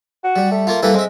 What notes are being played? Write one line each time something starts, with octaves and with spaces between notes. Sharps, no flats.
F#4
G3
A3
A#3 F4
E3 G3 A#3 A4
G#3 C4 E5